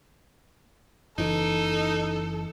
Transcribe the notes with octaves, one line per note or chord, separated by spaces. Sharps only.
F#1 E3 D#4 A4